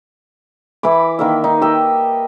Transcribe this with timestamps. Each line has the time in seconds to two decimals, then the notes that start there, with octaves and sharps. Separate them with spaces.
0.83 E3 E4 B5 D6
1.19 D#3 A#3 E5
1.44 D#4
1.61 G4 D#5 E5